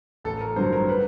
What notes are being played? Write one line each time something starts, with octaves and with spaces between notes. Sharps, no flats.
A1 A4
A#4
G2 D3 F#3 C5
A#4
B4